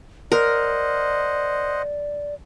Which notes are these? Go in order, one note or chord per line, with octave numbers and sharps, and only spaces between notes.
A#4 C5 D5 D#5 F#5